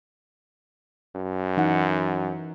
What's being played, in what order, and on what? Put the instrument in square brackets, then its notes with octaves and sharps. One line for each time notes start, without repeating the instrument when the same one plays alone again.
[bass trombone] F#2
[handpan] E3 D#4 F#5